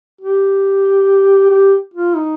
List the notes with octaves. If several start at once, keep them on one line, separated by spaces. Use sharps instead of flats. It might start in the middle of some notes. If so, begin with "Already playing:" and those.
G4
G4
F4
D#4